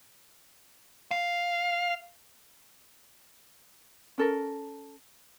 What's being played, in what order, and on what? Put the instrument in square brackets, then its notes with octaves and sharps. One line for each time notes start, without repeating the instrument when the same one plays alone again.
[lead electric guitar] F5
[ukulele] C#4 A4 A#4